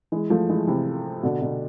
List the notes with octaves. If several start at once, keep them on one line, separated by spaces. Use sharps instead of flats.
E3 G#3
F3 A3
E3 G#3
C3 E3
B2 D3
B2